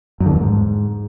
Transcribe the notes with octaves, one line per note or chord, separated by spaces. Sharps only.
F#2
D3
E2
F#2
G#2